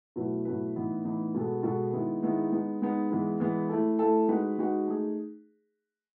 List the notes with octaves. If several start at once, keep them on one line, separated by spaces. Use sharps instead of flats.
B2 F#3 A3 E4 B4
B2 F#3 A3 E4 B4
A2 E3 B3 D#4
A2 E3 B3 D#4
B2 G#3 B3 F#4 A4
B2 G#3 B3 F#4 A4
D#3 G#3 B3 E4
D#3 G#3 B3 E4
G#3 B3 D#4
G#3 B3 D#4
E3 G#3 B3
E3 G#3 B3
A3 E4 A4
A3 E4 A4
G#3 D#4 F#4 B4
G#3 D#4 F#4 B4
A3 D#4 G#4